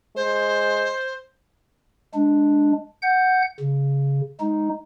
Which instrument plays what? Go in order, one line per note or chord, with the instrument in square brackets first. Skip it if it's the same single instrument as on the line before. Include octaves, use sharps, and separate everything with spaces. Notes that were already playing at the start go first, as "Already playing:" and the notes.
[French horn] G#3 [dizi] C5
[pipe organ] G#3 D4
F#5 G6
C#3
G#3 D#4